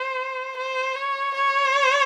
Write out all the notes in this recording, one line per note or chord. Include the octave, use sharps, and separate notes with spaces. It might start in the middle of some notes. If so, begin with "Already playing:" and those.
Already playing: C5
C5
C#5
C#5